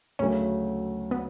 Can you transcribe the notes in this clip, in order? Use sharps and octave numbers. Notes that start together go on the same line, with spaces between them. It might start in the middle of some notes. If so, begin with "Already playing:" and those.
D2 C#3 F#3 A3 C#4
B3